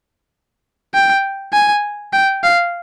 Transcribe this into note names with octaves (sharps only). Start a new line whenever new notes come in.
G5
G#5
G5
F5